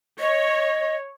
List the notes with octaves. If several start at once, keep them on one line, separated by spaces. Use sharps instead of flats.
C#5 D#5